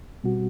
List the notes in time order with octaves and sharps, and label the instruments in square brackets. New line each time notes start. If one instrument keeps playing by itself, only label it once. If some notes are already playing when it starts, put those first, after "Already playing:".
[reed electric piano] B2 G3 C4 F#4